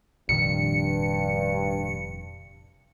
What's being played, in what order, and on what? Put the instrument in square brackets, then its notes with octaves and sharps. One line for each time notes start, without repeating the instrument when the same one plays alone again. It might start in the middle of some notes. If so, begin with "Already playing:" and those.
[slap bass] F1 [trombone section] G2 [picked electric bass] A#2 D#3 [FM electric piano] C#7